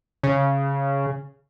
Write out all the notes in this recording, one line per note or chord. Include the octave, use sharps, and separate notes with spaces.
C#3